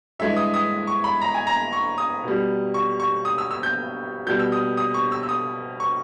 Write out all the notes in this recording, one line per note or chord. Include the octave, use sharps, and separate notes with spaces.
G2 E3 G#3 E5
D#6
D#6
C#6
B5
A#5
G#5
A#5
C#6
D#6
B2 G3
C#6
C#6
D#6
E6
E6
G6
B2 G3 G6
E6
D#6
D#6
C#6
E6
E6
D#6
C#6